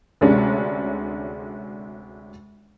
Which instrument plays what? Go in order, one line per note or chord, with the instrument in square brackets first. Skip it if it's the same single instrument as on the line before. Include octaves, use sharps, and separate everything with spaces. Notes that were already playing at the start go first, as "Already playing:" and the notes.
[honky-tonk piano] D2 C3 G#3 C#4 D4